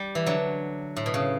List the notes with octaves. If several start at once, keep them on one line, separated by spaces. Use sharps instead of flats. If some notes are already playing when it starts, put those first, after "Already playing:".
Already playing: G3
E3
D3 F#3
A2
B2
C#3